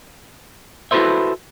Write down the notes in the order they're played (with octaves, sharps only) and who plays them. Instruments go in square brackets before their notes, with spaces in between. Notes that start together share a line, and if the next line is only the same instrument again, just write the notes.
[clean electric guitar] E4 F#4 A4 B4 C5 E5